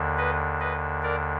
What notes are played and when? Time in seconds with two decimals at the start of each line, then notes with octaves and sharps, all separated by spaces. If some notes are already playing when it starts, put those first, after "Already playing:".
Already playing: D#2 D3
0.17 B4 D#5
0.60 B4 D#5
1.02 A#4 D5